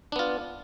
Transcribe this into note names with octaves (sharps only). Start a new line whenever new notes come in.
B3 D4 F4